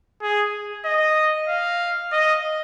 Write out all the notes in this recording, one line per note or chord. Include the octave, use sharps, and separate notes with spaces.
G#4
D#5
F5
D#5